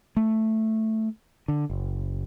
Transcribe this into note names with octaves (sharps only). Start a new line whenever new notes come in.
A3
D3
F#1